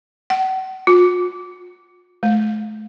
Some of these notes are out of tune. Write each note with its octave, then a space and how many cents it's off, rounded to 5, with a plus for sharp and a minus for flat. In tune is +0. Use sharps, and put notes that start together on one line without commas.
F#5 +40
F4 +45
A3 -40